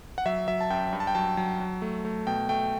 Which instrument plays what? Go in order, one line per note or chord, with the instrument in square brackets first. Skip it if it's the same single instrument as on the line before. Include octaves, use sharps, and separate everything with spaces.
[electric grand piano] F#5
F#3 E5
F#3 E5
A5
F#2 G5
G2
A5
G5
F#3 A5
F#3
F#3
A3
A3
B2 G5
A3 G5